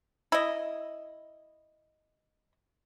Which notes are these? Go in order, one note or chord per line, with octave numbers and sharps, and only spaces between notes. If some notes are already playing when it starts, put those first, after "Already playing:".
E4 D#5